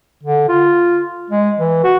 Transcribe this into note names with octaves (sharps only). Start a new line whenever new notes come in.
D3
F4
G#3
E3
F#4